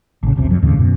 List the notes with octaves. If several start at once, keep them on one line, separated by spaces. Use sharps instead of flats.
A1 C#3
F#1 C#2 C3
F2 F#3
D1 D#2 A2 C#3
F#2 B2